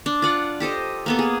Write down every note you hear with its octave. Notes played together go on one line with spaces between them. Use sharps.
D4
F4 D5 F#5
G4 A4 C5 D#5
A#3 B3 A4
G#4